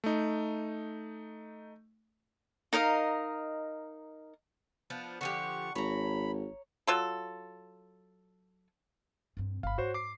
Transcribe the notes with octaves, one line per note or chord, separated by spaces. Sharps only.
A3 D#4
D#4 A#4 D#5 F5
F3 B3 D4
D3 F3 G4 F#5 C#6
G#1 C#5 A#5 B5
F#3 F4 A4
G2 C4
G1 F5 B5
G#2 F#4 C5 C#5
D6 C7